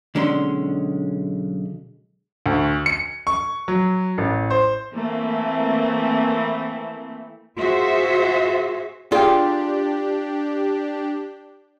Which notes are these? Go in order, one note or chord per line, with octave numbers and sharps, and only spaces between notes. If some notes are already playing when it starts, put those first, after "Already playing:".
B1 D3 G#3 C#4 A#5 C6
D2
C#7
C#6
F#3
A1
C5
E3 A3 A#3 C4
F4 F#4 G#4 C5 E5
D4 F4 G4 G#4 D5 G5